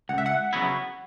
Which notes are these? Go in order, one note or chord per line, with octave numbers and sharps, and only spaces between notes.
C#2 F#5
E5
F#5
C#3 F#3 B3 E4